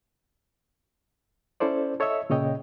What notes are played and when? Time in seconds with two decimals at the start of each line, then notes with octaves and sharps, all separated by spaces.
1.60 C#4 E4 A4 C5 D5
2.00 A4 C#5 D#5 E5 E6
2.30 A#2 C#3 C#5 D#5 G5